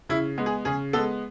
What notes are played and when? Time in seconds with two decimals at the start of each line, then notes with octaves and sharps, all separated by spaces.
0.09 C#3 E4
0.38 G#3 B3
0.46 G#4
0.65 C#3 G#4
0.93 G#3 B3 A4